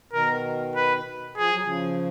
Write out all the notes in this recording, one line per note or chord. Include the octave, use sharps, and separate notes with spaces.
B2 D#3 A#4
B4
F3 G#4
F#3
C#3 F3